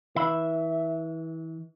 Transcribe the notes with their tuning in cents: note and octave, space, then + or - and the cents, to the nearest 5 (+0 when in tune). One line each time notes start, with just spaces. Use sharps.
E3 -30 E5 +0 B5 +0